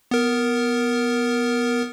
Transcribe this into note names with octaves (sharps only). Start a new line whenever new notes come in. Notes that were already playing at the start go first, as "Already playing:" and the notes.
B3 A#4